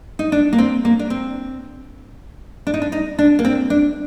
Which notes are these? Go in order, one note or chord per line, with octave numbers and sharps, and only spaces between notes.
D#4
D4
A#3
C4
A#3
D4
C4
D4
D#4
D4
D#4
D4
A#3
C4
D4